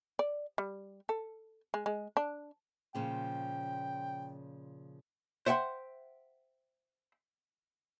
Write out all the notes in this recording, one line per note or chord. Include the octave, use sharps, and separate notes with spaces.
D5
G3
A4
G#3
G#3
D4
A#2 C#3 F3 G5
C5 E5 F#5 G5 C6